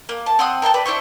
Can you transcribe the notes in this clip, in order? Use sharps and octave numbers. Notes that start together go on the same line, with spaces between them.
A#3
A5
C4 F#5 C6 D#6
A#4 E5 G5 A5
B4 D5
D4 E4 C5 C#6